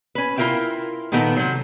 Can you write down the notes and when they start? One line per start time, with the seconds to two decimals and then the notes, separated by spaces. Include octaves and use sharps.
0.15 C#4 B4
0.38 E4 F4 A#4 E5 G5
1.12 A#2 D#3 B3 D#4 A4 A#5
1.36 C3 F#3